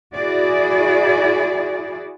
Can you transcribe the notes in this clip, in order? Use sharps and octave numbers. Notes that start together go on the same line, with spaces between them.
E4 F#4 G#4 D5